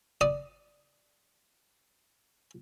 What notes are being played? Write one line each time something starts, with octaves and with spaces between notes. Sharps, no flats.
D5 D#6